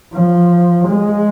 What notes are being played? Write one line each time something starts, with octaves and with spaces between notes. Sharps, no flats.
F3
G#3